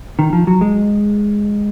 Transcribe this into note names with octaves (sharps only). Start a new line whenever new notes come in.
D#3
F3
F#3
G#3